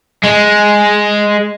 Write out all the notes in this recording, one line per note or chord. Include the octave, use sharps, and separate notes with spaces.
G#3